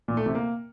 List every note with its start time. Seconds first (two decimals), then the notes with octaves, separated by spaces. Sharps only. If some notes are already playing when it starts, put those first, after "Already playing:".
0.08 A#2
0.17 A3
0.26 C3
0.35 A#3